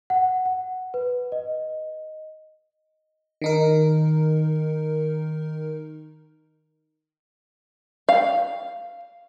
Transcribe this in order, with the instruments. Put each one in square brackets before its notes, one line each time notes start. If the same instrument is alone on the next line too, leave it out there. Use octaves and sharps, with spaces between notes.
[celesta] F#5
F#5
B4
D#5
[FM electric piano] D#3 D#4 A#4
[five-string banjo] F5